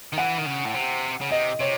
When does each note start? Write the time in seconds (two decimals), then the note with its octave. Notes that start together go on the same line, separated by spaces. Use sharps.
0.13 D#3
0.18 E3 F#5
0.39 D#3
0.46 C#3
0.65 A2
0.75 C3
1.22 C#3
1.32 C3 D#5
1.61 C3 C#5